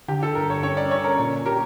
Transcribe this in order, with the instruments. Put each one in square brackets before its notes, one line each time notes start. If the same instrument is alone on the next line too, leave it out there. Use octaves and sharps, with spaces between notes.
[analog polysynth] D3 [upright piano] G4
[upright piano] A4
[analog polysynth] G2 [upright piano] A#4
[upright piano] C#5
[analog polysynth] C#4 [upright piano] C#5
[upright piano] D5
[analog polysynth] C#4 [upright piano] C#5
[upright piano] A#4
[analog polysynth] A#2 [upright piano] C#5
[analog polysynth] G4 [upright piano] A#4